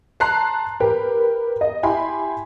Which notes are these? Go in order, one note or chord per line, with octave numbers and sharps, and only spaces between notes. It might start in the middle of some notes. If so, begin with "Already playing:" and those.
A5 A#5 C6 F#6 C7
G4 A#4 B4
D#5
E4 G4 G#5 B5 C6